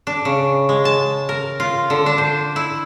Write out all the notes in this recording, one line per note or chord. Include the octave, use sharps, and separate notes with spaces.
D4
C#3
G#3
A5
A#4
F4
D3
D4
C5
E4